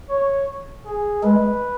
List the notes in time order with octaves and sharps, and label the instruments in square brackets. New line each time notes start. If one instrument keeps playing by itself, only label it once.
[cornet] C#5
G#4
[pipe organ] G#3 [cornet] B4